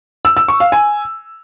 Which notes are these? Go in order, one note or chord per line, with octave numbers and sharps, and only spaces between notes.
E6
E6
C#6
F5
G#5